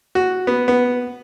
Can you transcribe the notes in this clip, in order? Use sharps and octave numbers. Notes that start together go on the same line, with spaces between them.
F#4
B3
B3